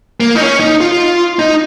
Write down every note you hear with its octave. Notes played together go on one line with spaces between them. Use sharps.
A#3
D#4
C#4
D#4
F4
D#4